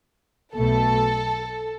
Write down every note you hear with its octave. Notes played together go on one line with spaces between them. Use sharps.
B1 B2 A3 A4